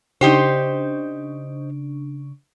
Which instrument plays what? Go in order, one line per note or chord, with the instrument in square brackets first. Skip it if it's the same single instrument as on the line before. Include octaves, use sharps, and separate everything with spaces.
[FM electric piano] C#3 D4 [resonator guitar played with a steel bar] D#4 G4 C5